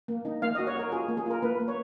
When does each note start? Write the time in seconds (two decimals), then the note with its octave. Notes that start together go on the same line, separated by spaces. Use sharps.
0.08 A#3
0.25 D#4
0.42 A#3 F5
0.55 D#5
0.59 F#4
0.67 C#5
0.76 F#4 A#4
0.92 F4 G#4
1.08 A#3
1.17 G#4
1.26 F4 A#4
1.42 A#3 B4
1.60 A#3
1.68 C#5